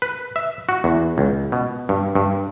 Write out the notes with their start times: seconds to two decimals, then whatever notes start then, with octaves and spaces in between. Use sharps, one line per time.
0.02 B4
0.36 E5
0.69 F#4
0.84 E2
1.18 C#2
1.52 B2
1.89 G2
2.15 G2